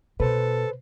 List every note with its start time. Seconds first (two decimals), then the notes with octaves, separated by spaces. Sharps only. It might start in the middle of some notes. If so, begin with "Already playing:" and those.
0.20 B2 A4 B4 C5